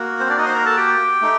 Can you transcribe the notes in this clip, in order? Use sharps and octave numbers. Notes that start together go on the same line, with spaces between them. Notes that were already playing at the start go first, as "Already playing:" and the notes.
Already playing: A#3 F#4
C4 C5
D4 D5
D#4 D#5
C5 C6
A#4 A#5
A4 A5
G4 G5
A3 D#4